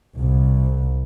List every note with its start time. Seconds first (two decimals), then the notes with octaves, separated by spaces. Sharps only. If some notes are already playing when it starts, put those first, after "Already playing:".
0.18 C2